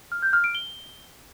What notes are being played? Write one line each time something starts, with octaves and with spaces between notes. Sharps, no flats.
F6
G6
F6
D7
G7